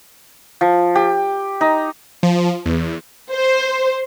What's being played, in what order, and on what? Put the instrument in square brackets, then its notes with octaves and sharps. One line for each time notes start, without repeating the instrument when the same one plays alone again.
[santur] F3
G4
D#4
[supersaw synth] F3
E2
[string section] C5